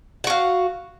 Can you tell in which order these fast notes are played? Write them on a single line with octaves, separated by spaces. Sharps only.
F#5 F#4 F5